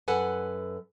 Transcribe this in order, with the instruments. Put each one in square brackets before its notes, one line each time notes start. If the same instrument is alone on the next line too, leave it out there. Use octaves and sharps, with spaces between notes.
[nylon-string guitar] F#2 A4 B4 F#5 G#5